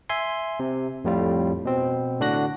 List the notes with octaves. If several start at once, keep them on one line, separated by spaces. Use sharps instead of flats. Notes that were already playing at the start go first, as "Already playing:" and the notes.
E5 G#5 C6
C3
F2 A2 G3 F4
B2 C4
A2 D3 D4 F#4 F#6 A#6